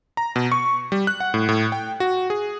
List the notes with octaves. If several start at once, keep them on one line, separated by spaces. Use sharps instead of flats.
A#5
B2
C#6
G3
F#6
F#5
A2
A2
G5
F#4
G#4